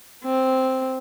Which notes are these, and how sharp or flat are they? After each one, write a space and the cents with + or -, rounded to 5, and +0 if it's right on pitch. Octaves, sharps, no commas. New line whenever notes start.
C4 +0